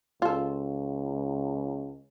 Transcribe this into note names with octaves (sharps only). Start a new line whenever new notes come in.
C#2 F4 A4